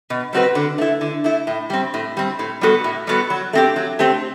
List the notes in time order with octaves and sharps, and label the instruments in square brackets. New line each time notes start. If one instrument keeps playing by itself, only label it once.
[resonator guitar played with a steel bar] B2
G3 C4 F#4 B4
D3
A3 E4
D3
A3 E4
A2
G3 C4
A2
G3 C4
A2
G3 B3 F#4 A4
A2
G3 B3 F#4 A4
F#3
A3 C4 G4
F#3
A3 C4 G4